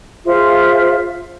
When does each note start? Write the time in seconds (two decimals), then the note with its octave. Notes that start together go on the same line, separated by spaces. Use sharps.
0.25 F4 G#4 C5 E5